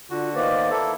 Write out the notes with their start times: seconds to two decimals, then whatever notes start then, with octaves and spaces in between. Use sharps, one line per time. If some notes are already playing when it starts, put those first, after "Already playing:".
0.10 D3 F4 F#4
0.35 D#3 A#3 B3 B4 C5 D5
0.70 A#3 E4 A4